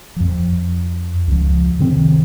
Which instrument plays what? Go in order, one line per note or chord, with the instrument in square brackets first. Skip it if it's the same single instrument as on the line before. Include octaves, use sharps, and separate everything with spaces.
[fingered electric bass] F2 F3
C#2 F3
C3 D#3 C4